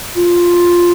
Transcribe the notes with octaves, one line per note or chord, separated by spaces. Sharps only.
F4